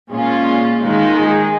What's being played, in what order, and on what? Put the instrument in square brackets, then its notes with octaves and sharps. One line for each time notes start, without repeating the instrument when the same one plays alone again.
[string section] A#2 G#3 C#4 F4 [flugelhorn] G#4
[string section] D#3 G#3 D#4 [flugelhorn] F4
[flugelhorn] G#4